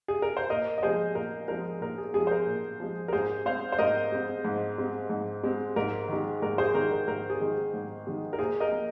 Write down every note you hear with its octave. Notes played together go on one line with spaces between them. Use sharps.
G#4
A#4
C5
A#2 A#4 D#5
D#5
F3 G#3 G#4 C5
A#2 A#4
F3 G#3 A#4
A#2 A#4
G#4
F3 G#3 G#4
C5
A#4
A#2
F3 G#3
A#4
G#2 G#4 C5
G#3 C4 C5 F5
C5
G#2 A#4 D#5
G#3 C4
G#2
G#3 C4
G#2
G#3 C4
G#2 A#4
D#3 G#3
G#2 A#4
G#4 C5
D#3 G#3 A#4
A#4
G#2 A#4
G#4
D#3 G#3
G#2
D#3 G#3
A#4
A#2 G#4 C5
A#4 D#5
A#3